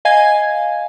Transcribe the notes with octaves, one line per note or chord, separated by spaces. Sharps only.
D#5 F5 G#5 G#6